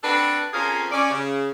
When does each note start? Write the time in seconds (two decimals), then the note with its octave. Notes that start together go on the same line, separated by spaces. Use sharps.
0.03 C4 D4 F#4 A4 B4
0.53 F2 F3 C#4 G#4 A#4 F5
0.92 C#4 D5
1.10 C#3